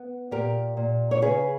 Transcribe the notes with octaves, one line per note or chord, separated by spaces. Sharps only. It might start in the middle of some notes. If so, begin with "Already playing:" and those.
Already playing: B3
A#2 G4 A#4
A#2
C#5
C#3 G#4 B4